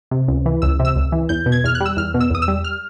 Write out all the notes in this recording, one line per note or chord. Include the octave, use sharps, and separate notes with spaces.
C3
C#2
E3
C#2 E6
C3
E6
C#2
E3
E2 G6
B2
G#6
E2 F6
F#6
G3
E6
E2 F6
B2
E6
E2 D#6
E6
G3
F6